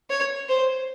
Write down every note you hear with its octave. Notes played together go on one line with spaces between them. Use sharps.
C#5
C5